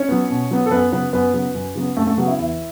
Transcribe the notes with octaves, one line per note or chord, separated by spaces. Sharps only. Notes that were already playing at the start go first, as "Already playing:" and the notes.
Already playing: C#4 C#5
F#3 B3
B2
F#3 B3
A4
F#2 B3 B4
C#3 F#3 B3 B4
F#2 B3 B4
C#3 F#3 B3
F#2
C#3 F#3 B3
F#2 A3 A4
A3 A4
C#3 F#3 B3 F#4
E4
E2 E4